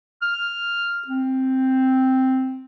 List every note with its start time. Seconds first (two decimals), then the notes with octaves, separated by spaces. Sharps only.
0.22 F6
1.07 C4